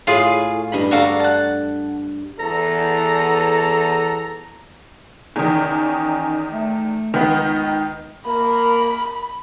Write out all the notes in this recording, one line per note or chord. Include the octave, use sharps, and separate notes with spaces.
A2 F4 G#4 F5
G2 D#5 B5
D4 F#4 A4 F5 A#5
F#5 A5
E2 A4 A#5
E2 D#3 C#4 D#4
A3
C#2 D#3 B3 D#4
A#3 A#4 B5